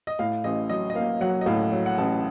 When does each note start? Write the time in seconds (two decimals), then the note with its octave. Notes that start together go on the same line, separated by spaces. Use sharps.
0.07 D#5
0.19 A2 F5
0.44 A1 D#5
0.69 F#3 D#5
0.90 D#5
0.95 A#3 F5
1.21 F#3 F#5
1.41 D#5
1.46 A2 F5
1.72 F#3
1.86 F#5
1.98 A1 A5